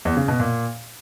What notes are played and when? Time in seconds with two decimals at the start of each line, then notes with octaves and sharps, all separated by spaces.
0.05 E2
0.17 C#3
0.28 B2
0.40 A#2